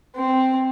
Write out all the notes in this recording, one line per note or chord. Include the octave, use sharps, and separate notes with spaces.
C4